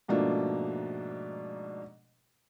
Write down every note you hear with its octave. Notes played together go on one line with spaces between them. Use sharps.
G#2 B2 F3 A3 A#3 D4